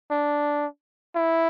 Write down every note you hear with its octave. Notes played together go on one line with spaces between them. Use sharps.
D4
E4